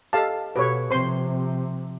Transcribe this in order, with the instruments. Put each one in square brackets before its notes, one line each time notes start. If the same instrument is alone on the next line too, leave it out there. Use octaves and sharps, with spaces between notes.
[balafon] G4 D#5 [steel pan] A4 F5 A5
[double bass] B2 [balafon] F#4 G4 A4 [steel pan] B4 C#5
[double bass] C3 F3 [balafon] C4 [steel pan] C5 C6